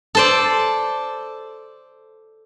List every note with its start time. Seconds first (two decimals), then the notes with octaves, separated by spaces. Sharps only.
0.15 A4 C5 D5